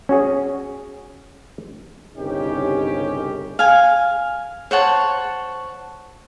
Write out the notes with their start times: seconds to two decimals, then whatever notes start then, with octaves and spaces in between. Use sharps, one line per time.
0.09 C#4 F#4 G#4
2.17 G1 C2 C#3 C#4 D#4 G4
3.59 F5 G#5
4.71 C5 C#5 F#5 A5